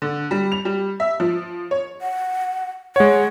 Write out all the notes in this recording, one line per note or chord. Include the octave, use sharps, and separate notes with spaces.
D3
G3
F7
G3
E5
F3
C#5
F#5
G#3 C#5 F#5